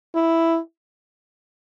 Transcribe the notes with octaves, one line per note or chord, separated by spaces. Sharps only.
E4